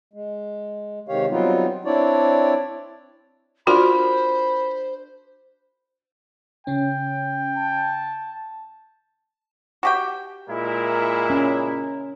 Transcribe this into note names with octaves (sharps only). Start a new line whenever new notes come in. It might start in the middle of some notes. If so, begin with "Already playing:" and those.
G#3
C3 D#3 G#3 G4 C#5 F5
F#3 G3 B3 C4 D#4 F4
C4 D4 E4 C#5 D5
D4 F4 F#4 A#4 C5 B5
C#3 C#4 G5
A5
F#4 G4 G5
A#2 G#3 E4 A#4
C#4